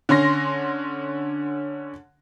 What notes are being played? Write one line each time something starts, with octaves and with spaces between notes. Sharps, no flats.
D3 C#4 C6 A#6